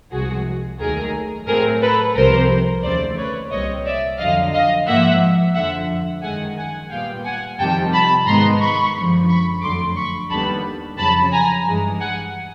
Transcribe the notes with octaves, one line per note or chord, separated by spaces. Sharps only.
C2 C3 F3 G#3 F#4 G#4
D#2 D#3 F#3 A3 G#4 A#4
A2 F#3 A3 C4 G#4 A#4
A4 B4
C2 C3 F3 A#4 C5
D#2 C#3 E3 A3 C5 D5
B4 C#5
C2 A#2 G3 C4 C#5 D#5
D5 E5
F2 D3 F#3 D#5 F5
D#5 F5
G#2 F3 A#3 E5 F#5
F2 D3 F3 E5 F#5
F#2 D#3 G#3 F#5 G#5
F#5 G#5
A#2 G3 B3 F5 G5
F#5 G#5
F2 C3 D#3 G3 G5 A5
A5 B5
G#2 D#3 G#3 B3 A#5 C6
B5 C#6
F#2 D3 F3
B5 C#6
F2 D3 F#3 A3 C6 D6
B5 C#6
D#2 D3 G3 B3 A5 B5
F2 C#3 F#3 A5 B5
G#5 A#5
G2 E3 G#3
F#5 G#5